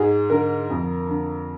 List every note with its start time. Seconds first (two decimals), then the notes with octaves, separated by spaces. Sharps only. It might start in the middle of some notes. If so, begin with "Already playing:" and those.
Already playing: G#2 G#4
0.30 D3 A#4
0.70 F2
1.09 D3